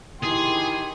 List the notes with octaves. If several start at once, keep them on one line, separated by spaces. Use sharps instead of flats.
D#3 E4 G4 G#4 C6